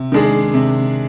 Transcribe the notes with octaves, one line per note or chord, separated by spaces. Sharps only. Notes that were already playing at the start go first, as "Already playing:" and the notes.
Already playing: C3
D#3 G#3 D4 G#4
C3